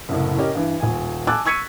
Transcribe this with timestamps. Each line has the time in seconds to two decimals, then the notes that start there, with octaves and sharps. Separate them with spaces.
0.09 F#1 C2 A2
0.38 C#4 G4 A#4 D#5
0.55 G2 E3
0.80 D#1 G#5
1.27 G#5 A5 D6 E6 F#6 A6
1.46 C#6 E6 G#6 B6 C#7 D#7